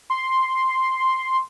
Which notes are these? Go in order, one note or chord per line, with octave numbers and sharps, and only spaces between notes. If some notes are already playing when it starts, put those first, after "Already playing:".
C6